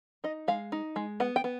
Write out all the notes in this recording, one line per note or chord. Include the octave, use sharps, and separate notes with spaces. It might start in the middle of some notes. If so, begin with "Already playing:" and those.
D#4 D#5
G#3 F5
D#4
G#3
B3 F#5
G5
B3